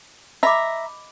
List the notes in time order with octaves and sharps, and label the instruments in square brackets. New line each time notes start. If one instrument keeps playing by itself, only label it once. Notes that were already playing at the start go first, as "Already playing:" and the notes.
[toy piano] D#5 B5 D6 [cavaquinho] E5 A#5